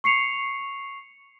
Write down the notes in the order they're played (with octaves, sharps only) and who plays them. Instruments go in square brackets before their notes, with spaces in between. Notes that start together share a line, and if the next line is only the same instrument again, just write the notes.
[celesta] C#6 C7 C#7 F7